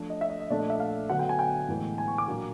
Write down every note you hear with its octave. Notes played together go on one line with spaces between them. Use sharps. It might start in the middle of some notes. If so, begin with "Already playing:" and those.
Already playing: F3 A3 D4
D#5
E5
D#5
D#5
A#2 F3 A3 D4 D5
D#5
E5
F5
D3 F#3 B3 F#5
G5
G#5
G5
A2 E3 G#3 B3
G#5
C#6
D6
A#2 F#3 A#3 D4